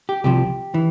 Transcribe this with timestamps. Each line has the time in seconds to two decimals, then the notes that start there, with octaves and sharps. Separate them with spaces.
0.09 G4
0.24 C2 C3 F3 G4
0.74 E3